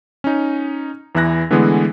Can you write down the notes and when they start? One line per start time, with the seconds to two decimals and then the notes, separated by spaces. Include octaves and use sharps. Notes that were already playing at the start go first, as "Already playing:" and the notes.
0.24 C#4 D#4
1.15 E2 E3 E4 F#6 A#6
1.51 D3 E3 G#3 A3 B3 G#4